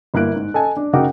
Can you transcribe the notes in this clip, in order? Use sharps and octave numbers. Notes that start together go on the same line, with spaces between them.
G1 A#3 E4 F#6 D7
G#2
A4 D#5 G#5 A5
D4
C#3 D#4 F#4 A#4 G5 D6